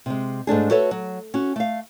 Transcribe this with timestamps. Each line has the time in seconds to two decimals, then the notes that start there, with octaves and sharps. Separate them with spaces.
0.06 C3 G#3
0.47 G#2 A3 D4 G#4
0.70 F#4 A4 B4 C#5 E5
0.91 F#3
1.34 C#4 F#4
1.56 A3 F5